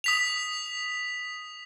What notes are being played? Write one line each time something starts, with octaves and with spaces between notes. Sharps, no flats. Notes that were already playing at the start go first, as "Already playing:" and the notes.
D#6 B6 F7